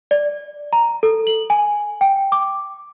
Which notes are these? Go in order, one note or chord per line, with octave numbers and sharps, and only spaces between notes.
D5
A#5
A4
F#7
G#5
G5
D6